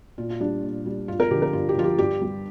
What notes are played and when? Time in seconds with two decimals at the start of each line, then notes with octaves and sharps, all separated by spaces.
0.18 A#2 F4
0.30 F4
0.40 G3 D4
0.63 A#2
0.86 G3
1.08 G2 F4
1.20 A#4
1.31 D3 F3 G4
1.42 A#4
1.53 G2 F4
1.69 G4
1.76 D3 F3 F4
1.84 G4
1.98 G2 G4
2.21 G3